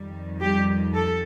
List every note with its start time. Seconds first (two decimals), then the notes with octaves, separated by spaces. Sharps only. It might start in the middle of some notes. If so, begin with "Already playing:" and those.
Already playing: F2 D#3 G3
0.42 G3 G4
0.94 A4